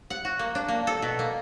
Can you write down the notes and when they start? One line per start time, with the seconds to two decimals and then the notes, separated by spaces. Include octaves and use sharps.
0.10 F#5
0.25 F#4
0.39 A#3
0.55 D4
0.69 A#3
0.87 A4
1.02 B2
1.19 A#3